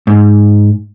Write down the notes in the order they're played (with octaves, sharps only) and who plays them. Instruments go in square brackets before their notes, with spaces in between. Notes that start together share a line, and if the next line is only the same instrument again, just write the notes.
[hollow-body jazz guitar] G#2